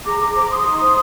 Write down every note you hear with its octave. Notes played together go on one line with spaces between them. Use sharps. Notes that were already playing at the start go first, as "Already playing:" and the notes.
G#4 A#5 D6
G#4 A#5 D6
C5 A#5 D6
G#4 C6 D#6
D#4
C5